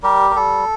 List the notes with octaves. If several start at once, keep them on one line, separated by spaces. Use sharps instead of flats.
G3 G4 A#4
A#4
G3 A4